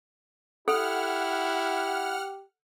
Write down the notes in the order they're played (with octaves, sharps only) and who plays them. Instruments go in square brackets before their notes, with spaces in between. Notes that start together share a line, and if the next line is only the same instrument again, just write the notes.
[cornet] E4 [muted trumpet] G4 [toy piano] A4 [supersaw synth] F#5 F6